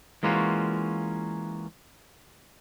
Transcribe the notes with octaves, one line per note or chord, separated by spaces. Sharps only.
E3 G#3 A#3 C#4 F4 F#4